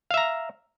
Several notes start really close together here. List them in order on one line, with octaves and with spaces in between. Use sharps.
F5 E5 A#5